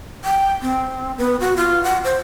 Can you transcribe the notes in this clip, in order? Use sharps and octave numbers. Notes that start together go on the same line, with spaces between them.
G5
C4
B3
F#4
F4
F#5
C5